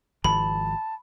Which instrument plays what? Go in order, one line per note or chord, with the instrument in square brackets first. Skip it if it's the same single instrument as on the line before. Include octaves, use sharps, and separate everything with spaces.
[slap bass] G#1 D#3 F3 [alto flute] A5 [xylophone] B5